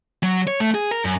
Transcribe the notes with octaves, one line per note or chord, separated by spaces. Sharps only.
F#3
C#5
A3
G#4
A#4
F#2